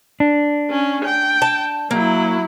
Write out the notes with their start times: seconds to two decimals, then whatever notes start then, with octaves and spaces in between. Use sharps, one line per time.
0.20 D4
0.70 C#4
1.05 G5
1.42 A5
1.91 F#3 A#3 E4